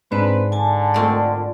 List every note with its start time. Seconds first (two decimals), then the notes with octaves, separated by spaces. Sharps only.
0.12 G#2 C4 D4 B4 C5
0.52 D3 G#5 A5
0.94 G#3 A3 C4 F4 A#4 D5